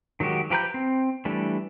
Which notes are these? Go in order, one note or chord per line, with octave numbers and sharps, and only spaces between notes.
D#3 F#3 G#3 F#4 G4
F3 G4 B4 A#5 G6
C4
E3 G3 A3 D4